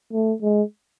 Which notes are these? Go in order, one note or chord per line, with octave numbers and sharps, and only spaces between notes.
A3
G#3